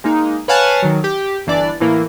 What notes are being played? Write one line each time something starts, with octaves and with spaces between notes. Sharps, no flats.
G#3 A#3 D#4
B4 C#5 F5 F#5 G#5 A5
D#3 F#3
G4
G1 E3 D4 D5
A2 E3 A#3